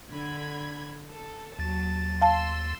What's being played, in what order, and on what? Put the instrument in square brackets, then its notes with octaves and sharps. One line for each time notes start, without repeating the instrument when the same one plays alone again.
[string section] D3 B5 G#6
A4
[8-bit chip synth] D#2 A6 [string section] F#3 A5
[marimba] F5 A5 [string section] C6 E6